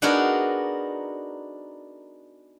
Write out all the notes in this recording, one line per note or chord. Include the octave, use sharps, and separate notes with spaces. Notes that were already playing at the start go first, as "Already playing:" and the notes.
B3 D4 D#4 F#4 G#4 A#4